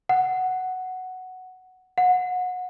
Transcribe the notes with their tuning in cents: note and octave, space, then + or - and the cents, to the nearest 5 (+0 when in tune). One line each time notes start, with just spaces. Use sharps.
F#5 +5
F#5 -25